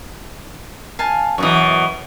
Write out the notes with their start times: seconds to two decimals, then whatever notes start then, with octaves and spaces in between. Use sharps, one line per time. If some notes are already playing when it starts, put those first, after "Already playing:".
0.99 F5 G#5 A5
1.38 F#2 B2 E3 C#6 D#6